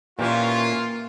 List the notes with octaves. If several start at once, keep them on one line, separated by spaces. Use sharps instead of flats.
A#2 E3 A#3 C#4 F4 G4